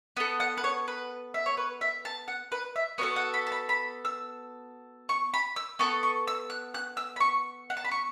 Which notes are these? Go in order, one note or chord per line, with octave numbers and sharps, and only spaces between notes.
B3 A4
F#5
B4
C#5
B4
E5
C#5
B4
E5
A5
F#5
B4
E5
B3 F#4 A4 C#5
F#5
B5
A5
B5
B5
E6
C#6
B5
E6
B3 A4 C#6
C#6
E6
F#6
F#6
E6
B5
C#6
F#5
A5
B5
C#6